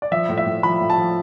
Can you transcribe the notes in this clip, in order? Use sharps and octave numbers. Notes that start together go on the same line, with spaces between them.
D5
F3 E5
A2
E5
A2
F3 B5
A2
A5
F3